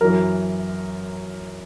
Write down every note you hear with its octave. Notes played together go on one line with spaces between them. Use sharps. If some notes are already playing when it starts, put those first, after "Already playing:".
F#2 E3 A#4